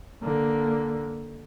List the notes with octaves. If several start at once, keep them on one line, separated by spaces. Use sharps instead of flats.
D3 A#3